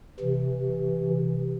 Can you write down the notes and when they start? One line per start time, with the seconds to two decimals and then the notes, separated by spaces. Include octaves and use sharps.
0.20 C3 E3